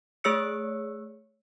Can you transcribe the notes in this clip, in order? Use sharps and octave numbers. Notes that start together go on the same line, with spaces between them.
A3 G#4 C#5 E6 C#7